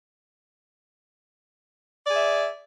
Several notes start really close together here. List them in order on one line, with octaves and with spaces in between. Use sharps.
D5 G#4 E5